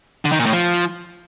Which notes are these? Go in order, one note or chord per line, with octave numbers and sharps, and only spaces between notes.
D3
D#3
A#2
A2
F3